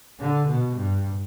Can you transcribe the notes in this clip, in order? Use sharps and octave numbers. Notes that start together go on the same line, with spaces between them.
D3
B2
G2